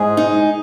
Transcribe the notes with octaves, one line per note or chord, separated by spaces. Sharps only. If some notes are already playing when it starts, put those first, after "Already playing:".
Already playing: G#2 G#4
D#4